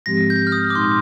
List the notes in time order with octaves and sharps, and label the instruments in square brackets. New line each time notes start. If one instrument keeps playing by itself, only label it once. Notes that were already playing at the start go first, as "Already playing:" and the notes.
[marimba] G#2 F3 G#3 C4 G4 [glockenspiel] A#6
[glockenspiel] G6
F6
D#6
D6
[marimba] A#2 G#3 D#4 [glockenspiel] C6